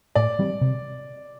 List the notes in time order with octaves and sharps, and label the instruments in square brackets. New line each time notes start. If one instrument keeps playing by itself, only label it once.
[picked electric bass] A2 [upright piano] D5
[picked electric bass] E3 G3 C4
C3